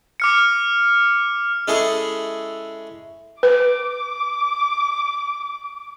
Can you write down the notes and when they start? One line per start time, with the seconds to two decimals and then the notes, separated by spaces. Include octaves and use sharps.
0.20 D6 F6 C#7
1.68 G#3 C#4 E4 G#4 A4
3.43 B4 D6